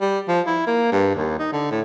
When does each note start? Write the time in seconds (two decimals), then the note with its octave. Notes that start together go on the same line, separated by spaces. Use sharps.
0.01 G3
0.28 F3
0.47 E4
0.67 A#3
0.92 G2
1.15 D#2
1.39 D#4
1.52 D3
1.71 A2